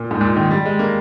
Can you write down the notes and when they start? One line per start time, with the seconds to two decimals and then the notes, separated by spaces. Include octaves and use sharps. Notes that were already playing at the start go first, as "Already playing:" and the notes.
Already playing: A#2
0.11 G#2
0.21 A#2
0.36 D#3
0.51 G3
0.66 G#3
0.79 A#3